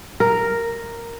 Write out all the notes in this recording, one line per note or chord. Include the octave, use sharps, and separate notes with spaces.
A#4